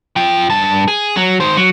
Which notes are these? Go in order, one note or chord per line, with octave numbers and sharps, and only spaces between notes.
F4 G5
G2 A5
G#4
F#3
D#3 C5
F#3